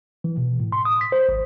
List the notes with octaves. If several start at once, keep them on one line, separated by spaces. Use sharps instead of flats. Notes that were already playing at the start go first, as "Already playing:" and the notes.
E3
B2
A2
C6
D#6
B6
C5
G#1